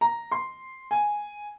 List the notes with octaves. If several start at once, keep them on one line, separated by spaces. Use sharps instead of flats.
A#5
C6
G#5